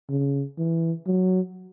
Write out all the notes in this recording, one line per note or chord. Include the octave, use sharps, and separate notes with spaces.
C#3
E3
F#3